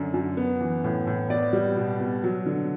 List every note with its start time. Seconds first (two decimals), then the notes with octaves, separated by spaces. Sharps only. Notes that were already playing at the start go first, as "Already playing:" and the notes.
Already playing: F#2 D3 F#3
0.14 F#2
0.37 B3
0.61 E3
0.84 A2
1.07 A2
1.30 B3 D5
1.53 G3
1.76 B2
2.00 B2
2.23 F#3
2.46 D3